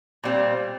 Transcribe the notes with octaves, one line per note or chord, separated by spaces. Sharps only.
A#2 G3 C4